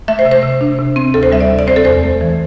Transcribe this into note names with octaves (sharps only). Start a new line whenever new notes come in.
A3 E5
C5
C3
C5
C3
D4
C3
C4
D2 A4
C5
G3 E5
D5
C3
D5
C4 C5
A4
E2 C5
A3
E3